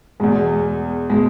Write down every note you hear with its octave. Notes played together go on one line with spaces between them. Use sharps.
E2 B2 G#3
B2 G#3